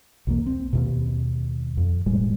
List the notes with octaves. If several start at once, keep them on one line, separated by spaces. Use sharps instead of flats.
B1 E2 A#3
C4
D#2 B2
F2
E1 A2 G3 G#3